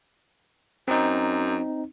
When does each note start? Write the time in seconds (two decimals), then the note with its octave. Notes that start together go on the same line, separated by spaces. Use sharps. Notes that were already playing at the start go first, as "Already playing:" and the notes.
0.88 F#2 C4 D#4